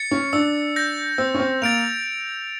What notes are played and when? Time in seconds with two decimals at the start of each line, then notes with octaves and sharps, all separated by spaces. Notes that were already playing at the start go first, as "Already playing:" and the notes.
Already playing: A6 C#7
0.11 C#4
0.33 D4 E6
0.76 G6 A#6
1.18 C4 E6
1.34 C#4
1.40 C4
1.62 A#3 A6 D7 F7